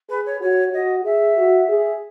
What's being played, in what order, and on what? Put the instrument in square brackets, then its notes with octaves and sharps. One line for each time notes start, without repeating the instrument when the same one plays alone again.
[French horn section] G#4 [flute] B4
[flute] C#5
[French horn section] F#4 [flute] C#5
[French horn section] F#4 [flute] D#5
[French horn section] G#4 [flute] E5
[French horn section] F#4
G#4